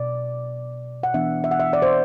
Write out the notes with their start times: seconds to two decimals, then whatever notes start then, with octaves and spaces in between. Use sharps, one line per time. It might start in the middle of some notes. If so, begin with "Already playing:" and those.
Already playing: B2 D5
1.03 F#5
1.14 E3 B3 D4 E5
1.44 E5
1.51 F#5
1.60 E5
1.73 D5
1.82 C5